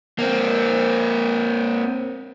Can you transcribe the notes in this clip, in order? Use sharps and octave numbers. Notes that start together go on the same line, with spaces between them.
A#3 C4